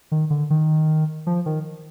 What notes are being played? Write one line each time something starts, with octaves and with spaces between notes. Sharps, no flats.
D#3
D3
D#3
F3
D#3